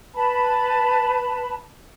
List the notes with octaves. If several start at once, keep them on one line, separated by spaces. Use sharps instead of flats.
B4 A5 B5